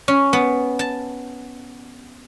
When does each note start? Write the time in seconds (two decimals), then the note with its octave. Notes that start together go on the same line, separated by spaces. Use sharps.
0.08 C#4
0.33 B3
0.79 A5